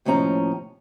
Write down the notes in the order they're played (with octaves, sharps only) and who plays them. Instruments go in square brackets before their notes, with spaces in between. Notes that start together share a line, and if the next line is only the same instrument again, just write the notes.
[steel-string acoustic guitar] D#2 A2 F3 C#4 A#5